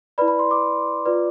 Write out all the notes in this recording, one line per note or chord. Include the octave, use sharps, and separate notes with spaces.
E4 B4 D5 B5
B5
C6
D6
F4 B4 D5